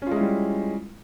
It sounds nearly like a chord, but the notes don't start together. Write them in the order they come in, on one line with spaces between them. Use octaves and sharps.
C#4 F4 G#3 E4 G3